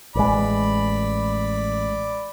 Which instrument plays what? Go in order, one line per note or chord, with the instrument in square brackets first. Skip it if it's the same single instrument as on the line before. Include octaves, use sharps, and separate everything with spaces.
[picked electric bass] A1 G#3 [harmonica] D5 B5